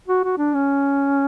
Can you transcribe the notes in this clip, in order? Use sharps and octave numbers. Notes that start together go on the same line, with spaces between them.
F#4
F#4
D4
C#4